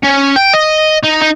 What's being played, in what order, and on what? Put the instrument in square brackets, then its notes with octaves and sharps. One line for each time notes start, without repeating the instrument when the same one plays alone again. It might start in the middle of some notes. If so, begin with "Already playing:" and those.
[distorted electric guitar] C#4
G5
D#5
D#4
D#4